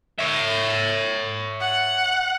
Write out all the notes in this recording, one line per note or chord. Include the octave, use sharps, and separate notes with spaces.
C#5 E5
F#5